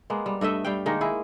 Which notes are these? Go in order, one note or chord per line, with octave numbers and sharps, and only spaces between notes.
G#3 A#3 B3
G3
G2 A3 D#5 E5
G3 F5 G5
D#3 G#3 A#3 D#4
E4 G#4